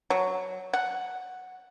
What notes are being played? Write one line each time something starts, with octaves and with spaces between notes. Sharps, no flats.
F#3
F#5